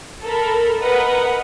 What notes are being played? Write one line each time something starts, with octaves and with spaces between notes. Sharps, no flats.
A4 A#4 B5
A#4 B4 D#5 F#5